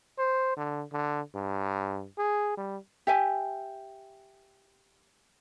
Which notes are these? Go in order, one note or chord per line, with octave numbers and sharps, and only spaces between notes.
C5
D3
D3
G2
G#4
G3
G4 E5 G#5